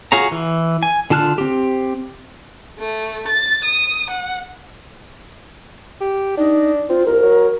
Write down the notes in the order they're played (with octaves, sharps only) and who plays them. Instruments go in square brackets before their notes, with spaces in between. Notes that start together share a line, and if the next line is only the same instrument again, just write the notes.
[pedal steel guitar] F4 F#4 G#4 C#5 A#5
E3
G#5
D3 F4 A5 F6 F#6
C4 G4
[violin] A3
A6
D#6
F#5
[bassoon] G4
[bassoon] D4 [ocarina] D#4
[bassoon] C4 [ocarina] F4
[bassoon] C2 [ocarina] A#4
[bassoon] F#3